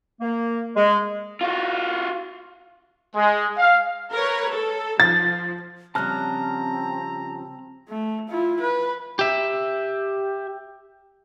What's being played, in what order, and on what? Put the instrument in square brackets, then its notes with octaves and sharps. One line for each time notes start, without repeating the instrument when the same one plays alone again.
[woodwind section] A#3
G#3
[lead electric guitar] F4 F#4
[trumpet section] G#3
F5
[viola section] A#4 B4 C#5
A4
[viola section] F3 [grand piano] A6
[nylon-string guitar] C#3 F3 G3 [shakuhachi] C4 [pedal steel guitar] A5 F6 F#6 [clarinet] A#5
[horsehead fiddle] A3
E4 F4
B4
[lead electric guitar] G4 E5